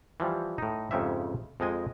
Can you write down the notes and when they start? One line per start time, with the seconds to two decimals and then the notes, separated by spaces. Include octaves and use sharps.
0.20 E3 F3 G3
0.58 A2 D#4
0.91 F2 G#2 C#3 C#4 G4 E5
1.60 F2 F3 G#3 D#5 G#5